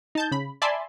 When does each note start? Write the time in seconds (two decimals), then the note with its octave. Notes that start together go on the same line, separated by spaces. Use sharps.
0.15 D#4 A5 G6
0.31 C#3 B5
0.62 D5 E5 G#5 A5 B5 C6